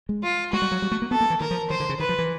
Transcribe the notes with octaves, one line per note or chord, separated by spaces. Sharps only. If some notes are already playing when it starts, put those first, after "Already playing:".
G#3
F4
G#3 F#4
G3
F#3
G3
A3
A#3
B3 A4
A#3
E3
D#3 A#4
F3
D#3 C5
D3
C#3
D#3 B4
F3
E3